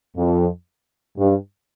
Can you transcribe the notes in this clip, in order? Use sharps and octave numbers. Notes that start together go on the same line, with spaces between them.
F2
G2